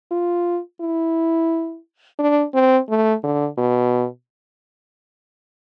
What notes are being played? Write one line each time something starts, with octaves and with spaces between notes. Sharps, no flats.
F4
E4
D4
C4
A3
D3
B2